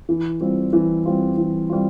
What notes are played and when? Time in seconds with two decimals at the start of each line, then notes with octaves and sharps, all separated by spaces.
0.09 E3
0.40 G3 C4 F4
0.73 E3
1.05 G3 C4 F4
1.37 E3
1.70 G3 C4 F4